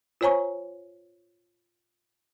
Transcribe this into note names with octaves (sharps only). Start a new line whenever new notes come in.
F4 C5 C#5 G#5 A#5 C#6